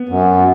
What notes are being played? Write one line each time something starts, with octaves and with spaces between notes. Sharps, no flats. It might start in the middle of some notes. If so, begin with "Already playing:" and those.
Already playing: B3
F#2